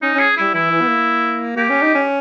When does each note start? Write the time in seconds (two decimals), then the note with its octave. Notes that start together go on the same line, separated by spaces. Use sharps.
0.02 C#4 D#4
0.15 C#4 G#4
0.37 G3 E4
0.54 E3 E4
0.71 E3
0.81 B3
0.88 A#3
1.56 A#3 G4
1.70 C#4
1.82 D#4
1.95 C#4